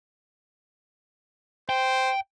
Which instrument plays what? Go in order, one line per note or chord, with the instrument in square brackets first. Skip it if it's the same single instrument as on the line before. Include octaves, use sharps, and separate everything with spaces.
[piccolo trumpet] C5 [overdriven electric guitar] G5